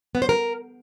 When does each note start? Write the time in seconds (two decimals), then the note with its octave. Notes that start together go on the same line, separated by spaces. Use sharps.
0.15 B3
0.22 C5
0.29 A#4